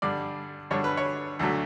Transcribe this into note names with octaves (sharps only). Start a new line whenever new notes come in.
G2 D3 G3 D5
G2 D3 G3 C#5
B4
C#5
D2 D3 F#3 A3